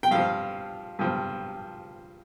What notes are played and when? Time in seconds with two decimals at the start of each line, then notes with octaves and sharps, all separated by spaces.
0.03 G5
0.11 G2 F3 F5
0.99 G2 F3